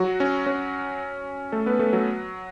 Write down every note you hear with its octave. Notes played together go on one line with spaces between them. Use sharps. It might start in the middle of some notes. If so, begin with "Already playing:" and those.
Already playing: F#3 F#4
C#4
C#4
A3 A4
B3 B4
A3 A4
F#3 F#4